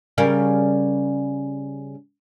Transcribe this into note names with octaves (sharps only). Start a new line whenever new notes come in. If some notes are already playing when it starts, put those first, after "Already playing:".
C#3 G3 A#4